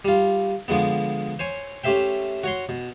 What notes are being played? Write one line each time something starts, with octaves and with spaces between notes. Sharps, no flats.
G3 F4
D3 F3 G#3 B3
C5 C#5 G#5
A3 C#4 G4 C5 E5 G5
F#4 C#5 C6
B2